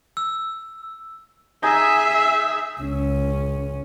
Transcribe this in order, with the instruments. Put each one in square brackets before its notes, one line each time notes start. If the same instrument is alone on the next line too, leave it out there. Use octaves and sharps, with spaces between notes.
[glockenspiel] E6
[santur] D#4 G#5 [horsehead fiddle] G#4 E5
[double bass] C#2 C#4